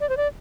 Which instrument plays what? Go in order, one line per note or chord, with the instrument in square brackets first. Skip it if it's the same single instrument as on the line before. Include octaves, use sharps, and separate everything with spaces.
[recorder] D5
C5
D5